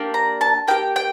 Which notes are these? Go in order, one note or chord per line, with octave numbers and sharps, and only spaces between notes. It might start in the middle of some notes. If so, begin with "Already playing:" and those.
Already playing: A#3 D4 G4
A#5
A5
A#3 D4 G4 G5
G5